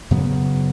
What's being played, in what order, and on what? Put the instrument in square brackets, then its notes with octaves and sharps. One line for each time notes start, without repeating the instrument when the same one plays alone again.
[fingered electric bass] F#2 C#3 F#3 B3